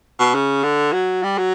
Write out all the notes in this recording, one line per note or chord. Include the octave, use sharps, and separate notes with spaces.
B2
C#3
D3
F#3
G3
F#3